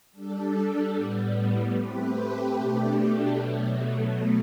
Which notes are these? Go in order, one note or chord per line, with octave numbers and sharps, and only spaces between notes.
G3 D4 A4
A2 G3 B3
A3 C4 G4 B4
B2 A3 D4 G4
B2 F#3 A3